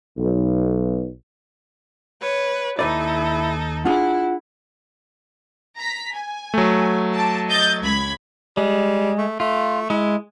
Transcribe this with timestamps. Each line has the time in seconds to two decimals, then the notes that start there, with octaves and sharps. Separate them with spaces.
0.17 B1
2.21 B4 C#5
2.79 D#2 D#4 E4 A4 B4 D5
3.85 D4 E4 F4 G#4 F#5
5.78 A#5 B6
6.13 G#5
6.54 F#3 A3
7.13 A5 D6
7.48 D#5 G6 A6
7.82 C#2 B5 G#6
8.57 G3 G#3
9.18 A3
9.40 A3 F4
9.90 G#3 E4